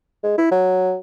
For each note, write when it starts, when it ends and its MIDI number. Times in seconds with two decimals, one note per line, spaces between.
0.23 0.34 56
0.38 0.48 64
0.51 0.96 54